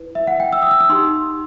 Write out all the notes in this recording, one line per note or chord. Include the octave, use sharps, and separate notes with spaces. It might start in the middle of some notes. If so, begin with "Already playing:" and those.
Already playing: E4 B4
E5
F#5
G5
E6
D#6
E6
D#6
D#4 G4 C6